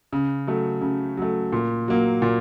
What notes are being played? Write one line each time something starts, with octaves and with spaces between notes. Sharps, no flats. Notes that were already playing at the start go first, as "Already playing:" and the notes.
C#3
F#3 A3
C#3
F#3 A3
A#2
F#3 A#3
A#2